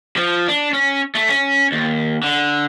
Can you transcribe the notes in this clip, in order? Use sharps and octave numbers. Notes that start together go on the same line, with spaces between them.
F3
D4
C#4
A3
C#4
D#2
D3